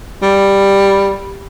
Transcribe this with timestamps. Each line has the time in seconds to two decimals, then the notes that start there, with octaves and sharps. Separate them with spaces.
0.22 G3